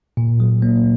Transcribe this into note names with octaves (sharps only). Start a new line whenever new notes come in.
A#2
F#3
A#3